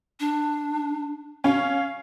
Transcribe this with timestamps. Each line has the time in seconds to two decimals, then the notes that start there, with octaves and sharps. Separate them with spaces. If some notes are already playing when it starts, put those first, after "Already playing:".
0.20 D4
1.44 C#4 F5